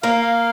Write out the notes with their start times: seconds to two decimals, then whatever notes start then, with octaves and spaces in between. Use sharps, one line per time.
0.03 A#3 F5
0.21 F5